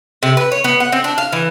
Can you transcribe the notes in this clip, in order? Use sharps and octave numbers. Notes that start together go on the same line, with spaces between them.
C3
B4
C#5
B3
F#5
C4
D4
F5
E3